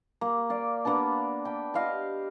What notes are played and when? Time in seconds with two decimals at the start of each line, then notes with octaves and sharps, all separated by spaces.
0.21 A#3
0.50 D5 F5
0.85 A#3 B3 D4 A5
1.45 G5 B5
1.74 G4 D#5 F5 C6